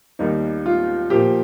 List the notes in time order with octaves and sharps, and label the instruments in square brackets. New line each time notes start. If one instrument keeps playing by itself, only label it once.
[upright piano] D#2 D#3 G3 A#3 D#4
F4
A#2 F3 A#3 G4